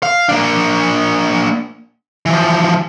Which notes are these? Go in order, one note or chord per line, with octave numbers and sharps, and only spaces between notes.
F5
A#3 D4
E3 F3